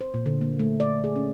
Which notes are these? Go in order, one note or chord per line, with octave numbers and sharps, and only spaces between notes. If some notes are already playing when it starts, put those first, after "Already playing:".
C5
A#2
D3
A#3
A3
D5
G#4
C#4